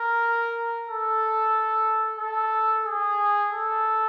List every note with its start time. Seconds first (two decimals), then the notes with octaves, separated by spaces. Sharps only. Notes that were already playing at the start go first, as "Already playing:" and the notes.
Already playing: A#4
0.90 A4
2.19 A4
2.85 G#4
3.51 A4